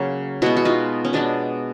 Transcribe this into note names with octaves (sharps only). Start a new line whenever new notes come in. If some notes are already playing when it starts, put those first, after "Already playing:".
Already playing: C#3 F#3 A#3
B2 G#3 B3 E4 F#4
F#4
D#4 F4
C#4
B2 G#3 B3 D4